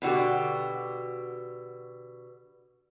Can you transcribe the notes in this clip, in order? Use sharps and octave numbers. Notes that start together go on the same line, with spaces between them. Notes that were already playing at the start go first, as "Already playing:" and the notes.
B2 D3 F#4 G4